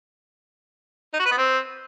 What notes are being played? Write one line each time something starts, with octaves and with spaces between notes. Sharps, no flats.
D#4
F#4
B4
B3
C4